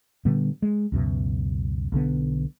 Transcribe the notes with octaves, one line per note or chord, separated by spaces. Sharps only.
A#2 D3 G3 B3
G#3
C#2 F#2 B2
B1 D3 B3